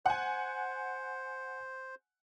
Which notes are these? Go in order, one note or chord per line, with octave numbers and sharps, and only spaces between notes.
C5 F#5 G#5